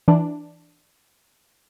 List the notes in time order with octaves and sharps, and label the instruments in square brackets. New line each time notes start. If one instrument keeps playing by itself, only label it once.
[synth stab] E3 D4